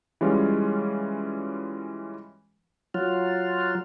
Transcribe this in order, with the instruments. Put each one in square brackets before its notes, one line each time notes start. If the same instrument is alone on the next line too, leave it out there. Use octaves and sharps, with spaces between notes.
[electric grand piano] E3 G3 G#3 C#4 F4
[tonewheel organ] F#3 F4